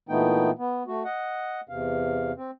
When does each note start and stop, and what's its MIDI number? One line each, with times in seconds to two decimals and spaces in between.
0.09 0.51 46
0.09 0.51 52
0.09 0.51 57
0.09 0.51 59
0.09 0.51 63
0.09 0.51 79
0.59 0.83 59
0.88 1.03 57
0.88 1.03 66
1.05 1.61 75
1.05 1.61 78
1.69 2.32 40
1.69 2.32 48
1.69 2.32 77
2.37 2.51 60